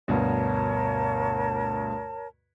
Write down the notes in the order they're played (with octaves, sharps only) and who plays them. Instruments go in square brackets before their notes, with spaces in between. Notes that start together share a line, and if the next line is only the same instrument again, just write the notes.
[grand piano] D2 G2 B2 [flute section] A#4 C#5 A5